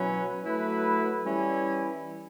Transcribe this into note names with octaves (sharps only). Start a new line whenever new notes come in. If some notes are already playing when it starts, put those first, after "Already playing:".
Already playing: B2 F#3 C#4 E4 B4
F#3 A3 E4 B4
E3 G3 C#4 E4